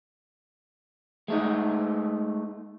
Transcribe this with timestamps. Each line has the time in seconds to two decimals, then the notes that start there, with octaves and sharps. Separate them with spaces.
1.28 G#3 A3 D#4